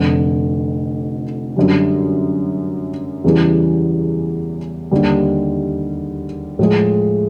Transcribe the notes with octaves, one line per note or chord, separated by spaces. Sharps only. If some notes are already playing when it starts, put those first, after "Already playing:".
Already playing: F1 F2 D3
F#2 D3 G3
E2 C#3 E3 G3
D#2 D3 G3
A2 F3 G#3